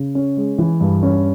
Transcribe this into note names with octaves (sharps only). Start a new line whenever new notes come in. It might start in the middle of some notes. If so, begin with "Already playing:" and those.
Already playing: C#3
C#4
G#3
E3
G2
C#4